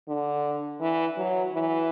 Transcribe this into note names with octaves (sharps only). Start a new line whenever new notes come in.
D3
E3
F#3
E3